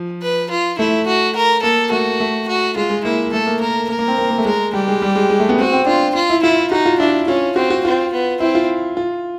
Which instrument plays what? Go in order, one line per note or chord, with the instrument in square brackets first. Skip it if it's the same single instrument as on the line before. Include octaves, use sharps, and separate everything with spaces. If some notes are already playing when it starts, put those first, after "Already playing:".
Already playing: [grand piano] F3
[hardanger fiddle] B4
F4
[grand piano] A3 [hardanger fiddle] E4
[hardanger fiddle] F#4
A#4
[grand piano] A#3 [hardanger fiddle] A4
[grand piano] A3 [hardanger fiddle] F#4
[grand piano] A3
[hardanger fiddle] F#4
[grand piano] G#3 [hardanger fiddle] F4
[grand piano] G#3
[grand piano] A#3 [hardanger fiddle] E4
[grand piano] A3 [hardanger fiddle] A4
[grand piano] A#3
[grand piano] A#3 [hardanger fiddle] A#4
[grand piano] A#3 [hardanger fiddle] A#4
[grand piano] A#3
C4
A#3
A#3
A3
[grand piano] G#3 [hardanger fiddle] A#4
[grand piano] G3 [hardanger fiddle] G4
[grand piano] G#3
G3
G#3
G#3
A3
B3
[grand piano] C4 [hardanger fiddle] F#4
[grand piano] C4
[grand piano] D4 [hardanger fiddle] F4
[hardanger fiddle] F4
[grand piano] E4
[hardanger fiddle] E4 [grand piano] F4
[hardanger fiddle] D#4 [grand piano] F#4
[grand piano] F4
[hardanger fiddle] D4 [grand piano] E4
[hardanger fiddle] C#4 [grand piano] F4
[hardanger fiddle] C4 [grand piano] F#4
[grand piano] F#4
[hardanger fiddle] C4 [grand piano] F4
[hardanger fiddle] B3
[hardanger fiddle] C4 [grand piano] E4
[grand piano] F4
F4